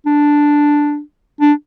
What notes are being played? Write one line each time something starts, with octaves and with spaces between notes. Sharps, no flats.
D4
D4